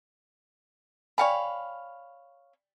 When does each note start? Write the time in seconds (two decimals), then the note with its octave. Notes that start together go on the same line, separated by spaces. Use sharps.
1.18 C#5 D5 F5 G5 G#5 B5